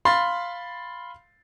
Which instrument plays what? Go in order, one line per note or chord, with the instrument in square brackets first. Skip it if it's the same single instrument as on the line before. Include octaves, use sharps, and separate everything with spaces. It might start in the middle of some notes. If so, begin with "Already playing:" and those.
[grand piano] F5 B5 C6 A6